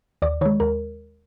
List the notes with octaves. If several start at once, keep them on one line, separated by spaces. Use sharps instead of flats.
D#2 D5
D#3 G#3 C#5
D#2 A#4